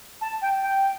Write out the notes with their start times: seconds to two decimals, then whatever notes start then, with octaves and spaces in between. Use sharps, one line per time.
0.21 A5
0.42 G5
0.62 G5